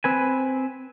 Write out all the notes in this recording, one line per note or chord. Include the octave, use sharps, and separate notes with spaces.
C4 B4 G#5